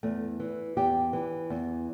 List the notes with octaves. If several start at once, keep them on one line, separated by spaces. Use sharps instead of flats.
E2 A3
E3
E2 G4
E3
E2